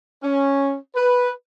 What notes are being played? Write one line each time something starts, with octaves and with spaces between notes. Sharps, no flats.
C#4
B4